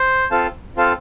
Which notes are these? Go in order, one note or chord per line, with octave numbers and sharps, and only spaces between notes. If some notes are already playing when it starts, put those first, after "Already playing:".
Already playing: C5
C4 F4 A4 F5 A5
C4 F4 A4 F5 A5